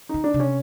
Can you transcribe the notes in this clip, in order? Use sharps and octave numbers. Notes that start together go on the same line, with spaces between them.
D#3 D#4
D4
C3
C#4